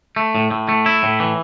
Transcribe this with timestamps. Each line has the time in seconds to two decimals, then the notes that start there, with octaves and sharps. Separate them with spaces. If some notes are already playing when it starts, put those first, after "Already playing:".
0.16 A3
0.35 A2
0.51 A2
0.69 A3
0.86 E4
1.03 A2
1.20 E3